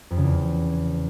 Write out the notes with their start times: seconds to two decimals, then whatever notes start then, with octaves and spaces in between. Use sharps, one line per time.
0.11 F2
0.17 C#3
0.24 E2